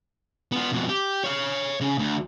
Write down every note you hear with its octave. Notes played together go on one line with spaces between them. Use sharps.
B3 F4
F2 B2
G4
C#5 F5
C#3
D2